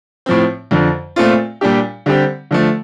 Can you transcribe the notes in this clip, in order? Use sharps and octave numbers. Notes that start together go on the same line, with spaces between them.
A2 F3 C4
F2 D3 F3
A#2 A3 C4 F4
A#2 G3 D4 G4
D3 G3 C4 G4
D3 F3 A3